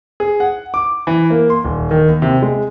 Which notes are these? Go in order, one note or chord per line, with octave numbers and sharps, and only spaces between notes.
G#4
F#5
D6
E3
A#3
C6
D#1
D#3
D#2
C3
G#3